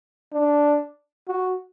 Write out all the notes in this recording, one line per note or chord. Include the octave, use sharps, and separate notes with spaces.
D4
F#4